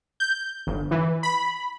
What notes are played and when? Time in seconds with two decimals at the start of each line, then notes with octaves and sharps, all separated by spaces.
0.20 G6
0.67 G1
0.91 E3
1.23 B5